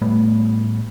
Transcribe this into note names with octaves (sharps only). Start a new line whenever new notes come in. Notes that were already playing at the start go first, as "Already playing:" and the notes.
A2 G3 A3 B3